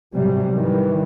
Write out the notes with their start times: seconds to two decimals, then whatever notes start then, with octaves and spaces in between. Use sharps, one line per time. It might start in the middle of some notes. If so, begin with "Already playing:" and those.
0.13 G#2 C3 F#3 G3
0.56 D#3 E3 G3